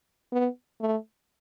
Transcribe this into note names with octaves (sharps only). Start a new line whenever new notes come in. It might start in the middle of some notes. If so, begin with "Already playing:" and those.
B3
A3